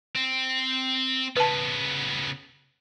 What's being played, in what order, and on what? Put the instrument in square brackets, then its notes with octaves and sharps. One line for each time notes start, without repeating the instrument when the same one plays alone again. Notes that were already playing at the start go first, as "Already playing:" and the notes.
[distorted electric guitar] C4
[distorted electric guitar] C#3 B3 [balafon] B4 A5